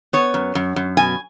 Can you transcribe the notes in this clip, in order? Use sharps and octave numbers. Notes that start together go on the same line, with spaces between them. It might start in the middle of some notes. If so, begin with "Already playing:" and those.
B3 C#5
F#2
F#2
F#2
B2 G#5